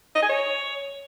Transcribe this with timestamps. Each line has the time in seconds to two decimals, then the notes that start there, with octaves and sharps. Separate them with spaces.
0.15 D#5
0.22 G#5
0.30 C#5